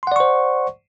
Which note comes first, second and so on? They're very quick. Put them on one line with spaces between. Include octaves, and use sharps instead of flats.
C6 F#5 D5 C#6 C5